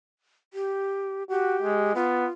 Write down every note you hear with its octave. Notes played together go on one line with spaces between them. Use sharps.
G4
F#4 G4
G#3
B3 F4